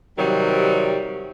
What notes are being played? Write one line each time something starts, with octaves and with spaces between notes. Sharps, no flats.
C3 D#3 F#3 G3